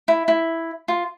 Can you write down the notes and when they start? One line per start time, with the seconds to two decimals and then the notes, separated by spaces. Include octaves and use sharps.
0.08 E4
0.28 E4
0.88 F4